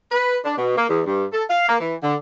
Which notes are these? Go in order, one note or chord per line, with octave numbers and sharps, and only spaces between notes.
B4
D4
B2
A#3
E2
G2
A4
F5
A#3
E3
D3